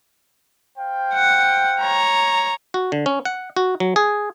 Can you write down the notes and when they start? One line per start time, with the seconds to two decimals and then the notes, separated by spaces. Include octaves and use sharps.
0.78 C5 F5 G5
1.14 F#5
1.81 C#5 A#5
2.74 F#4
2.92 D3
3.06 C#4
3.25 F#5
3.57 F#4
3.80 F#3
3.96 G#4